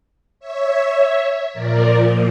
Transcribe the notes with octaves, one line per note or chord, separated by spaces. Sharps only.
C#5 E5
A#2 F3 A#4 D5